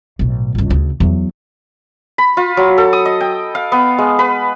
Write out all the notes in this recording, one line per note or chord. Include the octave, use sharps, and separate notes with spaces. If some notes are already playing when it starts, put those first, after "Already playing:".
B1 A2
G1 C#2
D2 C#3
E2 F#3
B5
F4
F#3
A4
D#6
D#5
G5
F5
B3
G#3
B4